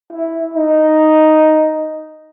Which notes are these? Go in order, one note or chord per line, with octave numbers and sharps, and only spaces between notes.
E4
D#4